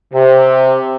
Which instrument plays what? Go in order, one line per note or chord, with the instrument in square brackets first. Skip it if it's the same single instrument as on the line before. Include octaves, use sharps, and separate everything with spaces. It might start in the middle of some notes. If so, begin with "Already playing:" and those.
[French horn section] C3